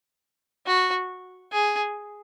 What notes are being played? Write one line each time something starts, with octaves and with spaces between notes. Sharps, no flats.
F#4
G#4